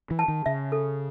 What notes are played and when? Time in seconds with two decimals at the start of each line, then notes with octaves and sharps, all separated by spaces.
0.11 E3
0.19 A5
0.28 D#3
0.46 C#3 E5
0.72 A4